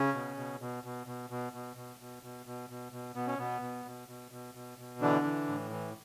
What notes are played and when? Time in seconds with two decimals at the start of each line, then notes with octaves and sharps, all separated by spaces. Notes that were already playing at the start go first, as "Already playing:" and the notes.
Already playing: C#3 C#4
0.14 B2
0.37 B2
0.61 B2
0.84 B2
1.07 B2
1.30 B2
1.53 B2
1.76 B2
2.00 B2
2.23 B2
2.46 B2
2.70 B2
2.92 B2
3.15 B2 B3
3.27 C#4
3.38 B2 B3
3.62 B2
3.85 B2
4.08 B2
4.31 B2
4.55 B2
4.78 B2
5.01 D3 E3 D4
5.24 E3
5.48 A2
5.71 E3